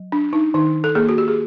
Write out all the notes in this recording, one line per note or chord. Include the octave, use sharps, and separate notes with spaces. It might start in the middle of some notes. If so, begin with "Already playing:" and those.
Already playing: F#3
D4
D#4
D#3 D#4
A4
A#3 G#4
F#4
G4
G#4